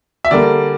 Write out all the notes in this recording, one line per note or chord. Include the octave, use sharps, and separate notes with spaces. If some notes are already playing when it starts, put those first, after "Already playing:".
E5
D3 G3 A#3 D5